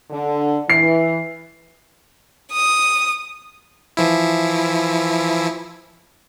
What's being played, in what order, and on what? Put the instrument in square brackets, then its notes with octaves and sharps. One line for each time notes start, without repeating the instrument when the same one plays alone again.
[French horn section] D3
[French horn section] E3 [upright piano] C7
[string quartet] D#6
[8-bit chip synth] E3 F3 E4